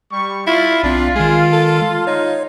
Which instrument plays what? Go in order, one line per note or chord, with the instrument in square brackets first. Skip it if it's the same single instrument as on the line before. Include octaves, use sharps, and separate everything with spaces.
[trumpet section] G3 C#6
[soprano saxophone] E4 [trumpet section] F4
[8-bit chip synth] B1 C4 [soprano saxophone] D4
[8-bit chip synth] D#3 G#3 [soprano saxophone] G#4
[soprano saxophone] A4
[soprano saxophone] D#4 [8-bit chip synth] C#5